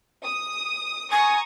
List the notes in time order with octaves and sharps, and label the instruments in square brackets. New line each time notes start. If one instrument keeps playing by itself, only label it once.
[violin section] D#6
[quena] G#5 [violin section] A#5 C#6 D#6